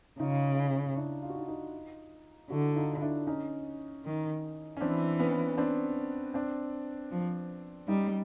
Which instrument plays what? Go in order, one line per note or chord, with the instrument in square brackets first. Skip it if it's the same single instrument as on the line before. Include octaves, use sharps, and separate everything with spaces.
[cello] C#3 [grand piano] D#4 F4
[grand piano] D4 E4
F4
F#4
D#4 F4
D#4 F4
[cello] D3 [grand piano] E4 F#4
[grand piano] D#4 F4
D4 E4
C#4 D#4
[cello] D#3
[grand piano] C#4
[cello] E3 [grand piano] C4 D4
[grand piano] B3 C#4
C4 D4
C4 D4
[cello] F3
[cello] G3 [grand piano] C#4 D#4